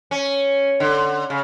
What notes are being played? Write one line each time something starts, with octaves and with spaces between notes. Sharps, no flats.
C#4
D3
C#3